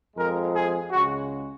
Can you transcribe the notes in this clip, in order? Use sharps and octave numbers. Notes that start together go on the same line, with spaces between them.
F2 F3 G#3 A#4
G#4
C#2 C#3 G#3 F#4